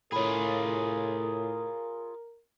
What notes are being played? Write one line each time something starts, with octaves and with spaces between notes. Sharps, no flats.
A2 F4 G#4 A#4 C#5 B5